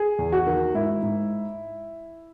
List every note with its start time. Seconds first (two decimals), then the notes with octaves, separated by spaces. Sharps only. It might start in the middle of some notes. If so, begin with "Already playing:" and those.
Already playing: G#4
0.19 E2
0.32 F#4
0.46 D#3
0.74 G#2 E4
1.03 G#2